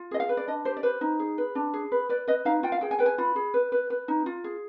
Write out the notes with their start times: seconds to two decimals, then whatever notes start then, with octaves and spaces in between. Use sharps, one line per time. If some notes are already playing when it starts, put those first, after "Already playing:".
Already playing: F4
0.11 G#4 D#5
0.20 F5
0.29 B4
0.37 D5
0.48 D4 D#5
0.65 G4 C5
0.77 D5
0.83 B4 C5
1.01 D#4
1.19 G#4
1.38 B4
1.55 D4
1.74 G#4
1.92 B4
2.09 B4 D5
2.28 B4 D#5
2.45 D#4 F5
2.63 F4 G5
2.72 F5
2.81 G#4 G5
2.91 G#5
2.99 B4 G5
3.06 G#5
3.18 F4 B5
3.36 G#4
3.54 B4
3.72 B4
3.90 B4
4.08 D#4
4.26 F4
4.44 G#4